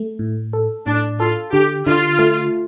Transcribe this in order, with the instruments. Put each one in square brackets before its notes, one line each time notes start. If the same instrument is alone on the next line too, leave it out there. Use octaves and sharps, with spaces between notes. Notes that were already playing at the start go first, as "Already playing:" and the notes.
Already playing: [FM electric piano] A3
A2
A4
[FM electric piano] A2 [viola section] D4
[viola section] F4 [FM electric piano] A4
[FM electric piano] D3 [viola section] G4
[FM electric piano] D3 [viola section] F4
[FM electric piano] A3